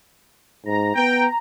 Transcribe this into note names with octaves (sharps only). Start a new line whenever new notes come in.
G#2 A#5
B3 G5